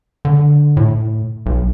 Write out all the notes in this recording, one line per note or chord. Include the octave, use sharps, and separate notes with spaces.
D3
A2
B1